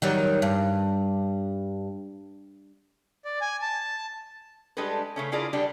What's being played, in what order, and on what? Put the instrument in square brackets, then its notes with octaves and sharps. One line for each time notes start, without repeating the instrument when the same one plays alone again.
[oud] D#3 F#3 G3
G2
[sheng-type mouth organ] D5
G#5
A5
[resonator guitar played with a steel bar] G3 G#3 D4 A4 B4
C#3 A3 C#4
D4 E4 F4 G#4 A#4 D5
D3 G3 D4